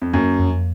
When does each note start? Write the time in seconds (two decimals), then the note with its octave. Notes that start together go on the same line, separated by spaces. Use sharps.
0.02 F2
0.13 F#2 A#3
0.39 F2